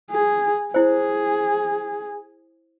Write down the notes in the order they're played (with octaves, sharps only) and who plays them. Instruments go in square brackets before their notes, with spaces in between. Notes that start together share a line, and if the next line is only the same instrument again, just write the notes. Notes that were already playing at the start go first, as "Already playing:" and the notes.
[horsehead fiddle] G#4
[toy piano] E4 C5 [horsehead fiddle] G#4